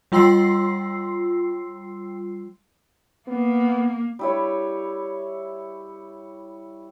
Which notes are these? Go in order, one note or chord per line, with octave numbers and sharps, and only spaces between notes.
G3 F4 G5 C6 E6 C7
A#3 B3
G3 E4 C#5